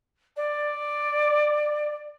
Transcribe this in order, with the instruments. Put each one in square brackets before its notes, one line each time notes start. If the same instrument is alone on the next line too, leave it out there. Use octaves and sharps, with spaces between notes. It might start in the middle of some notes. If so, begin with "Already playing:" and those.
[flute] D5